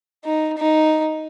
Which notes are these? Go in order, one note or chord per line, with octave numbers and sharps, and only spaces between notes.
D#4
D#4